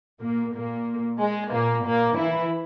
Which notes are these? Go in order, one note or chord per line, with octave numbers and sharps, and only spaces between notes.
A#2 A#3
A#2 A#3
G#3
A#2 A#3
A#2 A#3
E3 E4